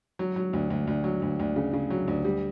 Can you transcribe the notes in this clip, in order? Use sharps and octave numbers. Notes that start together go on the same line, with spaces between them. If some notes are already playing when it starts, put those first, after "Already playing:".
F#3
F#3
D2
D2
D2
F#3
D2
D2
C#3
C#3
F#3
D2
G3